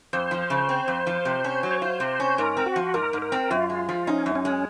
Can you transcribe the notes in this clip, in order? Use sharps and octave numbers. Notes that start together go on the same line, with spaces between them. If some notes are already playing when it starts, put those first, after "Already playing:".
F2 C5
F3
C#3
C4
F2
F3
C3
C#4
F#3
C#5
F4 C5
C3
C#4
G#2 A#4
C4
F#4
F3
G#2 A#4
G#2
A#4
C4
F#2 F4
G#3
F3
C#4 D#4
F#2
C#4
G#3